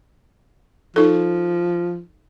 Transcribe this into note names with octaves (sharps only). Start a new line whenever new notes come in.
F3 D#4 A4